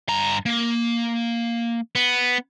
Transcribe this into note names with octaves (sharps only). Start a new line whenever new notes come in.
G2 A#5
A#3
B3